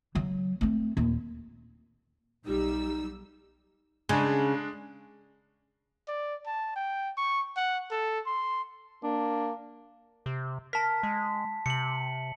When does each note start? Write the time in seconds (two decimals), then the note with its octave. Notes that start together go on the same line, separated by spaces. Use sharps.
0.15 C#3 F#3
0.61 A3 C4
0.97 D#2 A#2
2.45 B1 G3 D#4 E6
4.09 C#3 G#3 D4
6.08 D5
6.47 A5
6.76 G5
7.17 C#6
7.57 F#5
7.91 A4
8.26 C6
9.03 A#3 D4
10.26 C3
10.73 A#4 A5 B6
11.03 G#3
11.66 C3 C#7 F#7